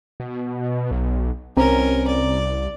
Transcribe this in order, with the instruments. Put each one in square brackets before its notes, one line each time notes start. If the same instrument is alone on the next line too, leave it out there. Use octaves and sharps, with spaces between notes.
[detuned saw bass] B2
B1
[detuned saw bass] C2 [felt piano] C4 A#5 [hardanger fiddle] C#4 A#4
[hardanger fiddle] D5